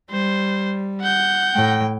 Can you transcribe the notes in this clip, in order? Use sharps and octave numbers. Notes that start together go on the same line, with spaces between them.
G3 C5
F#5 G6
A2 G5